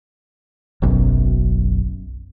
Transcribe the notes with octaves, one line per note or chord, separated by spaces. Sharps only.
F#1 B1 F#2